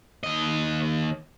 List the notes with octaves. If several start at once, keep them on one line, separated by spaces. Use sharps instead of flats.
D#2 D#5